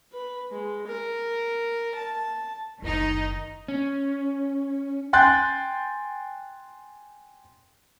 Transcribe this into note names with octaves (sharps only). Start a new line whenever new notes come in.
B4
G#3
A#4
A5
F#1 D2 D#3 D#4
C#4
G5 G#5 C6 F#6 G6 A6